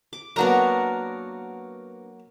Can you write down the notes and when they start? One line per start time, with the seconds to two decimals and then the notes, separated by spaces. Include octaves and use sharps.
0.13 D6
0.36 F#3 A#3 B3 D4 F#4 A#4 A#5